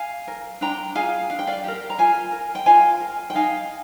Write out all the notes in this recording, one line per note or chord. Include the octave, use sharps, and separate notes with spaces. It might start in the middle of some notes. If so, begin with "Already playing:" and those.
Already playing: F5 G#5
A#4
D4 G5 A#5
F4 G#4 F5 G#5
D4 F5
G5
D5 F5
G4 A#4
A#5
F4 F5 G#5
A#4
G5
F4 F5 G#5
A#4
G5
D#4 F5 G#5